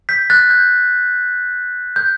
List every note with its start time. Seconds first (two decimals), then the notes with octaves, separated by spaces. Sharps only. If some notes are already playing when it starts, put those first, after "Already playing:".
0.09 G6 B6
0.30 F#6 A6
0.50 G6
1.96 G6